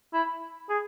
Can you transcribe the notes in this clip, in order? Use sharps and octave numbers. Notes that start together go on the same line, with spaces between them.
E4
G#4